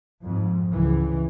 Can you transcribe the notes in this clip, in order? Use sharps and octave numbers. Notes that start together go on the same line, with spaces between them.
F2 G#2
C#2 E3